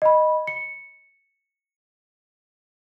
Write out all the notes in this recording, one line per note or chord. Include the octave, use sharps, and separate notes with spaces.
D#5 B5
C#7